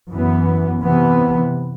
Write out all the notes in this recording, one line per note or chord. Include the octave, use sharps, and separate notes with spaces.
F#2 E3 B3
C3 E3 B3